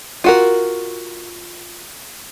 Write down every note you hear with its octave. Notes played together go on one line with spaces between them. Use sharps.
F4 F#4 A#4